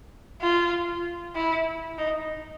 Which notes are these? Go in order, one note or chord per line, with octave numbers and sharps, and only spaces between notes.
F4
E4
D#4